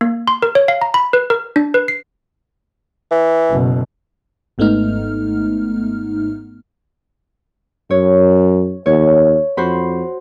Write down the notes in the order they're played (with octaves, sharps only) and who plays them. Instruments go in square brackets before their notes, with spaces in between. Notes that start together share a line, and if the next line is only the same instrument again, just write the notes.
[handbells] A#3
C6
A#4
C#5
F5
A#5
B5
B4
A#4
D4
B4
C7
[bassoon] E3
[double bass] F#1 B2
[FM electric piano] G#1 G#2 A3 B3 D#4 F6
[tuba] F#2 [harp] C#5
[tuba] D#2 [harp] C#5
[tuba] F2 [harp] F#4 C5 B5